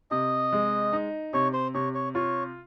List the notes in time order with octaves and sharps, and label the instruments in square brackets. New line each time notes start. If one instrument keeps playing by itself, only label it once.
[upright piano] C3 [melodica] D#5
[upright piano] G#3
D#4
[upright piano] C3 [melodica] C#5
[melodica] C5
[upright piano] C3 [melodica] C#5
[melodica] C#5
[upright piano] F4 [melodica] C#5